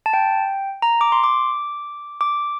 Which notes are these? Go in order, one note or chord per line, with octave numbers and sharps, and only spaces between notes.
A5
G5
A#5
D6
C6
D6
D6